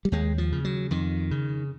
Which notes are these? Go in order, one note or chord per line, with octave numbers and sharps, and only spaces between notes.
G3
D#2 G#3
F3
C#3
F#3
F2 D#3
C#3